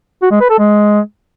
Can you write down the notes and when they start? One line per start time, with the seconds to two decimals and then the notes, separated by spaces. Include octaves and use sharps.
0.22 F#4
0.31 G#3
0.41 B4
0.50 A4
0.59 G#3